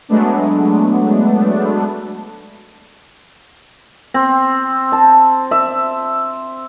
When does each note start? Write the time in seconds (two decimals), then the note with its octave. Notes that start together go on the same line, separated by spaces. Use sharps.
0.09 F#3 G#3 A3 B3 D4
4.14 C4
4.92 A5
5.51 E5